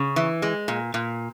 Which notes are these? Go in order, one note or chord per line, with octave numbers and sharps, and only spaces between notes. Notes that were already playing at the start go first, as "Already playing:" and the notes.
Already playing: C#3
E3
G#3
A#2
A#2